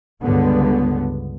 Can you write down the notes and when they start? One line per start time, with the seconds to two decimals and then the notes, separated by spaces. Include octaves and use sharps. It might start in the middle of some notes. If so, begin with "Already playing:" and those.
0.21 C#2 G2 D3 B3